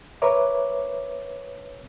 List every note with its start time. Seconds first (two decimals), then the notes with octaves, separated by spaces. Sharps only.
0.22 A#4 B4 C#5 E5 D6